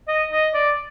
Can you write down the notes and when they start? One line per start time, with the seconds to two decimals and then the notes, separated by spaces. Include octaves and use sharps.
0.08 D#5
0.31 D#5
0.54 D5